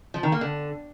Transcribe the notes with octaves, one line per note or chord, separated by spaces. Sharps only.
F3
D#3
A#3
D3